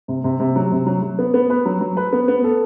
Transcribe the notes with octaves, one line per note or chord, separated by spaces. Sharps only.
C3
C3
C3
F#3
C3
F#3
F#3
B3
B3
B4
F#3
F#3
B4
B3
B3
A4